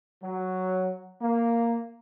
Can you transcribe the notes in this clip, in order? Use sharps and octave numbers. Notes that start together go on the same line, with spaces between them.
F#3
A#3